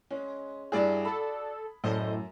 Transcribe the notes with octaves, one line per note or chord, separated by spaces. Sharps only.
G#3 C#4
G2 E4 F#4 G#4 D5
A4 B5
F#2 A2 A4 C5 D#5